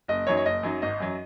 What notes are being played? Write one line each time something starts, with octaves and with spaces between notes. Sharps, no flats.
F#1 D#5
F#2 F#3 D#4 C#5
C#5
F#1 D#5
F#2 F#3 D#4
G#1 D#5
F#2 F#3